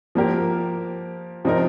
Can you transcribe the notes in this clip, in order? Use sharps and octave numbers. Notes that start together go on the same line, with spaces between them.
F3 A#3 G4 A#4
C3 F3 D#4 A#4